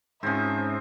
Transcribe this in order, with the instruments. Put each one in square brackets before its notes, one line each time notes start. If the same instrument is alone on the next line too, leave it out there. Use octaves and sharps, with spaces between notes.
[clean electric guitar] G#2 C#4 [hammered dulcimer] F3 C4 [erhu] E5